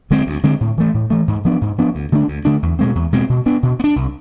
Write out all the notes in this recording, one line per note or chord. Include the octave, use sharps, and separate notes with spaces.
D3 G#3 C4
D2
D3 G#3 C4
A2
E3 A3
A2
E3 A3
G#2
F3 B3 D4
G#2
F3 B3 D4
D2
D3 A3 D4
D2
D3 A3 D4
E2
B2 G#3 C4
E2
B2 G#3 C4
B2
B3 D4
B2
B3
D4
C2